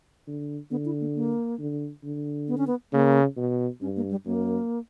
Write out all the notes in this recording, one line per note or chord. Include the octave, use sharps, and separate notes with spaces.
D3
D3 B3
E4
A#3
A#3
D3
D3
B3
C#4
B3
C#3 A#3
B2
G2 C#4
A#3
G3
F#2 A#3